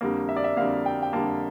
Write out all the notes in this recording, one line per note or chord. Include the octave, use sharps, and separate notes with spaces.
F2 D3 G3 A#3
E5
D5
E5
F2 D3 G3 A#3 F5
G5
G5
F2 D3 G3 A#3 A5